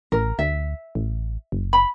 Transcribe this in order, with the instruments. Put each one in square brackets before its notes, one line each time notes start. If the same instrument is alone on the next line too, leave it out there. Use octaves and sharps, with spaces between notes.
[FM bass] A1 [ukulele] A#4
[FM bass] D2 [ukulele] E5
[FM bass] A1
F#1
[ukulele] B5